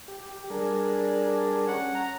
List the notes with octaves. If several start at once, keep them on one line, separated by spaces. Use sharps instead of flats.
G4
G3 D4 G#4 A#4
C#4 F#5
A#5